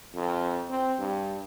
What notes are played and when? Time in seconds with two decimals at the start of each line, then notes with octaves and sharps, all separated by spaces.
0.14 F2
0.69 C4
0.99 G2